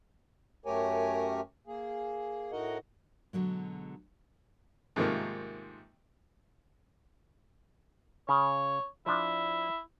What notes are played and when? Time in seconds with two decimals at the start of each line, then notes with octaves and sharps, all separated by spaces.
0.66 F#2 A3 G4 A#4 C#5 G#5
1.67 A#3 G#4
2.52 A2 D#4 F#4 A#4 D#5 F#5
3.33 B2 D3 F#3 G#3
4.96 G#2 C3 D#3 F3 A3 A#3
8.29 C#3 C#5
9.06 F3 D4 E4